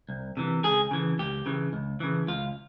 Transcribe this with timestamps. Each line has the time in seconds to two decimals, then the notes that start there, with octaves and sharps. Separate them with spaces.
0.09 C2
0.37 C3 E3
0.64 C#2 G#4
0.91 C#3 E3
1.19 C#2 G4
1.46 C#3 E3
1.73 C#2
2.00 C#3 E3
2.28 C#2 F4